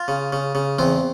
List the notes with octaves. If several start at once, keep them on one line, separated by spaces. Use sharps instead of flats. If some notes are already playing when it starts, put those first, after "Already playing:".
Already playing: F4
C#3
C#3
C#3
E2 C4